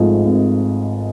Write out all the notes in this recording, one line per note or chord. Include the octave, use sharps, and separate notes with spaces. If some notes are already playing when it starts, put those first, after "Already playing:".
Already playing: G#1 G#2 F3 A3
G#1